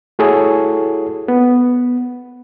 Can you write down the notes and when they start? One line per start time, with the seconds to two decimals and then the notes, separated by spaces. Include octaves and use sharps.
0.19 A3 E4 F#4 G#4 A4 C#5
1.28 B3